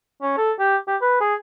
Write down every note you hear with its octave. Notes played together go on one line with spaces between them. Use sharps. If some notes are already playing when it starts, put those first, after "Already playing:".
C#4
A4
G4
G4
B4
G#4